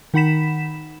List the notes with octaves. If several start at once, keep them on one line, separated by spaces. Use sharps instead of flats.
D#3 D#4 F#5 B5 B6 E7